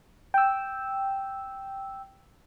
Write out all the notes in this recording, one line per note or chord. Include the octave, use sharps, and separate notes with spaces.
G5 E6